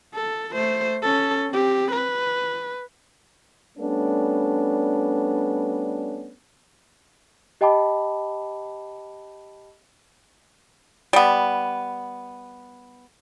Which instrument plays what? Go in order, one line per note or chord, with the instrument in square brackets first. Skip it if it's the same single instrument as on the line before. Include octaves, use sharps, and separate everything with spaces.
[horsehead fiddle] A4
A3 C5
C#4 A4
C4 G4
B4
[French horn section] G3 A3 B3 C#4 D4
[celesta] G4 D#5 G5 A5 B5 D6
[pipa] G3 B3